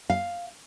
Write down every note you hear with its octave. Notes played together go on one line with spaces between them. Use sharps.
F5